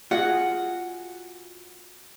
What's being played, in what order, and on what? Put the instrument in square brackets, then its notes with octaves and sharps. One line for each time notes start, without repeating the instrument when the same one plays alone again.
[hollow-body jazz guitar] F4 F#4 G#4 [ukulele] F#5